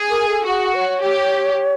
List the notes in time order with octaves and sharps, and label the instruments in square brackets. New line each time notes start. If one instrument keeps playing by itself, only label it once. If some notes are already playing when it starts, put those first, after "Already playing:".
Already playing: [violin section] G#4
[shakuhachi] A#4
A4
[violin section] F#4 [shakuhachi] G#4
[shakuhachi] C#5
[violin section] G4